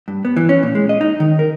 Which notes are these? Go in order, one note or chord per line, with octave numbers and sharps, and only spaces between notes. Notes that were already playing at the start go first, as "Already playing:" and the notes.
G2
B3
E3
C#4
A#2
G#3
D#5
D#4
D#3
A#4